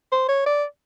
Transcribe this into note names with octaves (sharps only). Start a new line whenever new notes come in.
C5
C#5
D5